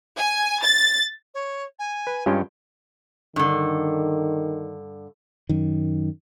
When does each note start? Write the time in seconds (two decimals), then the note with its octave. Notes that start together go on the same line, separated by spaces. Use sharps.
0.19 G#5
0.62 A6
1.34 C#5
1.78 G#5
2.07 B4
2.26 G2 G3 G#3 C#4 F4 G5
3.36 G2 D3 D#3
5.49 F#2 D#3